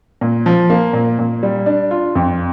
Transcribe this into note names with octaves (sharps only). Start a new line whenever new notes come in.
A#2
F3
A#3
A#2
A#2
G3
D4
F4
F2